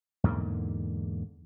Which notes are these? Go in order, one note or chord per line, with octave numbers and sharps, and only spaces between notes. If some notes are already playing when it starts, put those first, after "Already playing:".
E2 G#2 D3 A#3